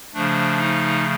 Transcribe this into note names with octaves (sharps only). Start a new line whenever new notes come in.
C#3 F3 A3 D4
D#4